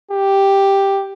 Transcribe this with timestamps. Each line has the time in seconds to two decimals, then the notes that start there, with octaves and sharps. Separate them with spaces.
0.11 G4